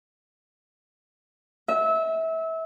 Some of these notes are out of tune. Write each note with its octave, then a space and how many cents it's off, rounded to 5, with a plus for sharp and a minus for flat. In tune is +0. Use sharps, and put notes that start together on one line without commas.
E5 -25